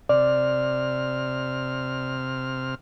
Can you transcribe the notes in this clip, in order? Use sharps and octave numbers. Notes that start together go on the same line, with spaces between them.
C3 D5 F6